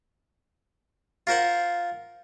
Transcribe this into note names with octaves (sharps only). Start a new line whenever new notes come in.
F4 A#4 C5 F#5